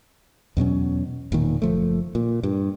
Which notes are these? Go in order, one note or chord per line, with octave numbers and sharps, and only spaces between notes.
E2 B2 F#3 C#4
E1 A#2 D#3
F#1 F3 A3
A#2
G2